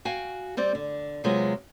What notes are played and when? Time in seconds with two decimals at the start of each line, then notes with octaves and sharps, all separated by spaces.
0.05 F#4 F5 G5 G#5
0.57 G3 C4 D5
0.75 D3
1.24 C3 F#3 G#3 B3 F4